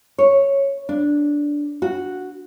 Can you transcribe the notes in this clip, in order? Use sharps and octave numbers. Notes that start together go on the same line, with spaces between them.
C#5
D4
F#4